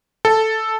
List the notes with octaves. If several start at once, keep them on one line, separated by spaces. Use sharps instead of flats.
A4